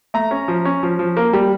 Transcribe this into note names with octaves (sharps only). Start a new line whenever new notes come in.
A3 A#5
C#4
F3
C#4
F3
F3
A#3
G3